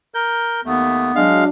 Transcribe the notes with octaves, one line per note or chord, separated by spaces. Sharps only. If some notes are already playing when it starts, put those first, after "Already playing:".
A#4 G6
D#2 A3 B3
F#3 G#3 D4 F5